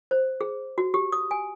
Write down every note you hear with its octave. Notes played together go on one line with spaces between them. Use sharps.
C5
G#4
F#4
G4
D#6
G#5